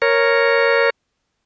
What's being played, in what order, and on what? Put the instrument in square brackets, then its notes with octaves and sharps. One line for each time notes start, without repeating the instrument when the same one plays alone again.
[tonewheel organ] A#4 C#5